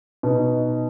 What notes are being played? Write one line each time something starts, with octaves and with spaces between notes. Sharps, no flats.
B2 D#4